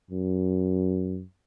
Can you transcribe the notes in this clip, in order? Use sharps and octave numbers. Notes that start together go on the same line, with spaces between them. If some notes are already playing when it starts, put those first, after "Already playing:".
F#2